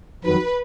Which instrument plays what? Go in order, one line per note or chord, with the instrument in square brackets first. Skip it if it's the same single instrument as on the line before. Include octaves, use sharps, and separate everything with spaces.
[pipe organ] F2 D#3 F#3 [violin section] B4